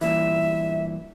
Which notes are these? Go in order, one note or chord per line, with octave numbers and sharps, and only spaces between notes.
G2 A#2 E3 E5